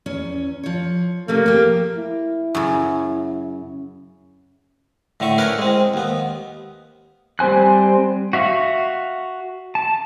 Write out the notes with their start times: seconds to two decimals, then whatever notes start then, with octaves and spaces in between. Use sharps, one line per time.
0.06 E2 C#4
0.63 F3 C#5
1.28 C3 A3 A#3 C4
1.46 F3 G4
1.96 E4
2.55 F#2 C#3
5.20 A2 D3 A3 C#6
5.38 C#4 D4 E4 A#4 B4 C#5
5.58 G#3 C4
5.94 D#2 B3
7.39 G3 C4 C5 G#5 F#6
8.33 F#4 E5 F5 C#6
9.75 A5